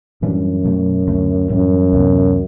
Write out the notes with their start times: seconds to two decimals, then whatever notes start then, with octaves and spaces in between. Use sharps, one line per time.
0.22 F#2 A2 E3 G3 D4
0.65 B2 F#3 A3
1.07 D2 D3 A3
1.50 F#2 A2 E3 G3
1.92 D2 C3 E3 B3